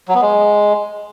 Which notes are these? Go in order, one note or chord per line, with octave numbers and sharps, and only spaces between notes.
F#3
B3
G#3